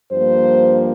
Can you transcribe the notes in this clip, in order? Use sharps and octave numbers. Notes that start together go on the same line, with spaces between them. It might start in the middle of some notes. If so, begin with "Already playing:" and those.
G2 F3 A#3 C5